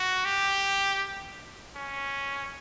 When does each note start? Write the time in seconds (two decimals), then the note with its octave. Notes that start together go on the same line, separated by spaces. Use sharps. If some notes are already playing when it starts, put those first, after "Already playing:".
Already playing: F#4
0.25 G4
1.75 C#4